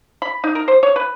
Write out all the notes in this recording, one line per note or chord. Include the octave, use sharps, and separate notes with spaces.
B5
D#4
A#4
C5
C#5
B4